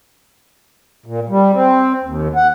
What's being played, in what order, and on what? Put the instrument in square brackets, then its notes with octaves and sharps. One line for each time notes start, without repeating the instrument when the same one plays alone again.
[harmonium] A#2
G3
C4
D#2
F#5